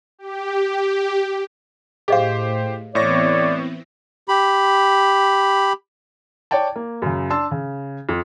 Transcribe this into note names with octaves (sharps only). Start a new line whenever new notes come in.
G4
A2 G4 G#4 C5 D#5 F5
A2 E3 B3 C4 C#5 D5 C#6 A#6
G4 B5
C#5 D5 G5 A5
A#3
F#2 C#3
D4 A5 C6 E6
C#3
F2